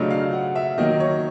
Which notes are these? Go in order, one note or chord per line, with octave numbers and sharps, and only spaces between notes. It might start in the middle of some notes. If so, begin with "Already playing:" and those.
Already playing: C#3 F#3 A3 D4 F4 D#5
F5
F#5
E5
D#3 F#3 A#3 D#5
C#5